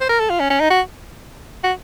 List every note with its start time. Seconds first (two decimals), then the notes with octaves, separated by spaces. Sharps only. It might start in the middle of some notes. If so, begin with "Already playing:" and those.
0.01 C5
0.09 A#4
0.20 A4
0.30 F4
0.40 C#4
0.50 C#4
0.60 D#4
0.70 F#4
1.64 F#4